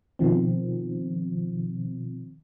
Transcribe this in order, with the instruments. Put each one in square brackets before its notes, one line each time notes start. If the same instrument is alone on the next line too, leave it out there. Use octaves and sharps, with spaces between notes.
[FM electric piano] B2 D#3 F3 C4